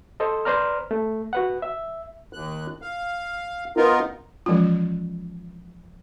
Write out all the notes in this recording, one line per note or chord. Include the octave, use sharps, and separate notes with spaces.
A4 C5 D#5
B4 C5 D5 A#5 F6
A3
F#4 B4 F#5
E5
D#2 F#6
F5
B3 D#4 F4 A#4
E3 F3 G#3 C#4 F4